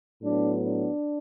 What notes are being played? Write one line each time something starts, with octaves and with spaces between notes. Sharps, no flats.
A2 F#3 B3 D4
D4